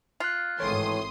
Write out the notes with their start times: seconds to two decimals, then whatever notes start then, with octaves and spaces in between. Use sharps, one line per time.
0.20 F4 F5 F#6
0.60 G#1 A2 E3 A3 C#5 C6 D#6